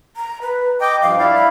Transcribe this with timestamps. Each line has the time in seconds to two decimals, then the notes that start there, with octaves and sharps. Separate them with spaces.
0.16 A#5
0.42 B4
0.81 D#5 G5 D6
1.02 G2 F3 F5
1.19 E4 D5 F5
1.35 B5